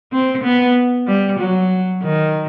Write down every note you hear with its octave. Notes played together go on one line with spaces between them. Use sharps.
C4
B3
G3
F#3
D#3